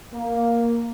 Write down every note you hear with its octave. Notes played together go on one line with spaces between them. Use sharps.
A#3